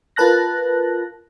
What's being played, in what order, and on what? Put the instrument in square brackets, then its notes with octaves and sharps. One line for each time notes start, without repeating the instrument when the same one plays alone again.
[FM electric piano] F4 A#4 B4 A5 F#6 A#6